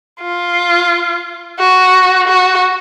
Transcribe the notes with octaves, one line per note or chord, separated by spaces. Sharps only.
F4
F#4
F#4